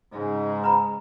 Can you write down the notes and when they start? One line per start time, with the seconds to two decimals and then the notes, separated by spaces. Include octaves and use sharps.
0.12 G#2 C#3 G#3
0.64 B4 A#5 B5